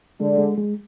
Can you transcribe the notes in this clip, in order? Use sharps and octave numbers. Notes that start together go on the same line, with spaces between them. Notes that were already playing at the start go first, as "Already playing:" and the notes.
D3 G#3
G#3
G#3